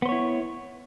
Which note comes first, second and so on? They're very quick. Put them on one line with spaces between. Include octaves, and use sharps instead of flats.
B3 C5 C#5 E4